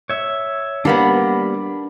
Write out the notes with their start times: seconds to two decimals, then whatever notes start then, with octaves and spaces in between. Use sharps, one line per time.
0.10 C#5 E5
0.85 G3 A#3 B3 D4 B5